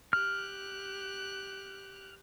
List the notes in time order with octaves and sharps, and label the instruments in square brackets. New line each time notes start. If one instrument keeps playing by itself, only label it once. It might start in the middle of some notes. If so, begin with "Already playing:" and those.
[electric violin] G4 F#6 [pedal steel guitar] F6